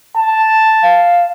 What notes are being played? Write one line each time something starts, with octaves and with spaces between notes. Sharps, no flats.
A5
F5